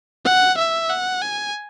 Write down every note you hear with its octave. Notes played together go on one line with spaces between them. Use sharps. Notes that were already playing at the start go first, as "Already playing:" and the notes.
F#5
E5
F#5
G#5